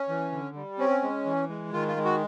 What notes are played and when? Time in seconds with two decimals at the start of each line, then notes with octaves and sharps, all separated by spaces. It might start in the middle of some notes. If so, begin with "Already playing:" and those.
Already playing: C#4
0.09 E3
0.32 D3
0.55 G3
0.79 C4 C#4
1.02 G#3
1.26 E3
1.49 G#3
1.73 D#3 F4
1.88 F4
1.97 G#3
2.05 F#4